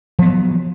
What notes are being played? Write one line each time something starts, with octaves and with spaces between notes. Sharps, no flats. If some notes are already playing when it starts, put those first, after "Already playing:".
F3 F#3 B3